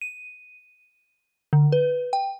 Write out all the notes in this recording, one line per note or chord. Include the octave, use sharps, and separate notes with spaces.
D#7
D3
B4
G5